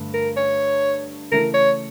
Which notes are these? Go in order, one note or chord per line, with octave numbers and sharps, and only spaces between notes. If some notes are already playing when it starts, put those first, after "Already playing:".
Already playing: G2 D3 A3
A#4
C#5
C#3 E3 A3 E4 A#4
C#5